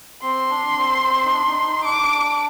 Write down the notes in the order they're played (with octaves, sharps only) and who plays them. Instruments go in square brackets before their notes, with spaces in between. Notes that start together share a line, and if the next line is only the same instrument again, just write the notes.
[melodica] C4 [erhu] C6
[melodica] D4
C4
C4
D#4
D4
D#4
D#4
[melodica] D4 [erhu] D6